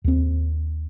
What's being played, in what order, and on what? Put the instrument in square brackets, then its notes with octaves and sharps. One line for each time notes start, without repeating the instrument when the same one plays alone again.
[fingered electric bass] D#2 C4